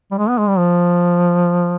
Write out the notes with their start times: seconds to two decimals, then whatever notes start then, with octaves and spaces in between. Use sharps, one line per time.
0.11 G3
0.18 G#3
0.29 B3
0.38 G#3
0.48 G3
0.58 F3